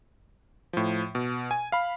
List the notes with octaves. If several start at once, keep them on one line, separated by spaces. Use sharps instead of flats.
A2 F3
B2
G#5
F5 B5